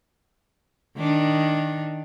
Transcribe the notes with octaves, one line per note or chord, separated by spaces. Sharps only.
D#3 D4